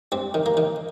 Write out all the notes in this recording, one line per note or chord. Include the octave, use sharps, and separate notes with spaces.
G2 C4
D#3
A#3
D#3